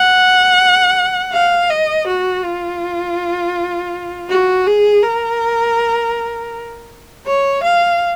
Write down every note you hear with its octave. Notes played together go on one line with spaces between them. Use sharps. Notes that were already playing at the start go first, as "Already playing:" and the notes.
Already playing: F#5
F5
D#5
F#4
F4
F#4
G#4
A#4
C#5
F5